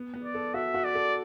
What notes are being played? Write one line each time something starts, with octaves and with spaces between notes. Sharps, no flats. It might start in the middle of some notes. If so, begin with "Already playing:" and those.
Already playing: B3
B3
D5
A4
F#4 E5
F#4
D5
A4